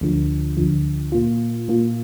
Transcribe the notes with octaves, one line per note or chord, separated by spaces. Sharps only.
D2 D3 F3
D2 D3 F3
A#2 A#3 F4
A#2 A#3 F4